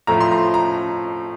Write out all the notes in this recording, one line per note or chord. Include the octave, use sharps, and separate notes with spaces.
A2 F3 A3 C4 A#5
C6
A#5
A#5